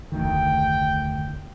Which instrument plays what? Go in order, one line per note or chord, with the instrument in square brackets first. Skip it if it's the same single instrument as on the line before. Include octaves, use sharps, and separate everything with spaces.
[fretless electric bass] F1 D2 D#3 [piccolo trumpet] G5